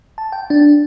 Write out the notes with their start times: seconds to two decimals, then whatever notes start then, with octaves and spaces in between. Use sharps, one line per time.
0.18 A5
0.32 G5
0.50 D4